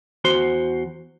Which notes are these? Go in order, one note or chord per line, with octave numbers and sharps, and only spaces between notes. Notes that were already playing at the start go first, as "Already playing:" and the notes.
E2 F#4 C5 C6